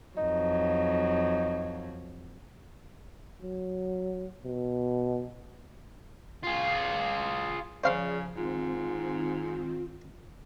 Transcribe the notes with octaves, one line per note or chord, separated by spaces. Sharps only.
F2 F#3 D#4
F#3
B2
F4 G#4
C#3 F3 G#4 C5 D5 F5 C6
G#2 D#3 C4 F4